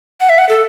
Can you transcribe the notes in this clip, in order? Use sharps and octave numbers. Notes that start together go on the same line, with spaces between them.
F#5
E5
F#5
A4